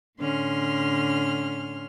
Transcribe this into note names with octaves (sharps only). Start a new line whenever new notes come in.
A2 D3 C#4 C6 F6